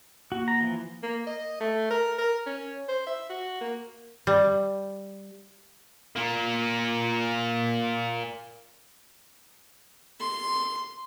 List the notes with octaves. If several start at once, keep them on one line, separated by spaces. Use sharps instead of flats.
A#3 F#4
A#5
E3 F3
A#3
D#5
A3
A#4
A#4
C#4
C5
E5
F#4
A#3
G3
A#2 A#3
C6